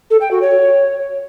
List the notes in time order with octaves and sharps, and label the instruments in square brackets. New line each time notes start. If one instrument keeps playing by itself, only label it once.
[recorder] A4
G5
F#4
C#5